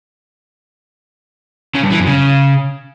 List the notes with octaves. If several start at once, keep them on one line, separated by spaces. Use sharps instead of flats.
C#3
G2
E3
F#2
C#3